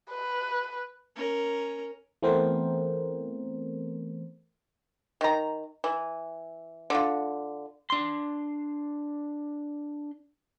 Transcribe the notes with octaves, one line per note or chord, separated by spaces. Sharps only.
B4
C#4 A#4
E3 A3 B3 C4 A#4 C5
D#3 A#5
E3
D3 F4
D4 C6